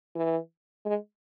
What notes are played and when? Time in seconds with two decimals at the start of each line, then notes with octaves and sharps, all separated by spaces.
0.16 E3
0.86 G#3